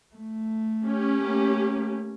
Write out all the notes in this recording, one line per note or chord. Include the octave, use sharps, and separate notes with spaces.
A3
C#4 G4
A3 A#3